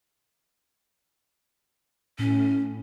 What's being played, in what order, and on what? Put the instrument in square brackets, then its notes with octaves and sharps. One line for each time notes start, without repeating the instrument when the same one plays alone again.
[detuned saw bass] A2 [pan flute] C#4